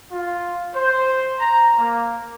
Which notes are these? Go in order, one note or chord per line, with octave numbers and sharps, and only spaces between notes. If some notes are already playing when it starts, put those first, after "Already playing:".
F4
C5
A#5
A#3